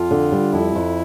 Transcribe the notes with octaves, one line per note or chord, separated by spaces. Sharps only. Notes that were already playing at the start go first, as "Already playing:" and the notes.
Already playing: F2 F4
D3
G3
F2 E4
F2